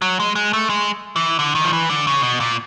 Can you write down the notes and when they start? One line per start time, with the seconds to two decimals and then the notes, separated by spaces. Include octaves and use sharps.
0.02 F#3
0.20 G#3
0.35 G#3
0.53 A3
0.70 G#3
1.16 E3
1.39 D3
1.55 D#3
1.64 F3
1.73 E3
1.90 D3
2.07 C#3
2.23 B2
2.40 A#2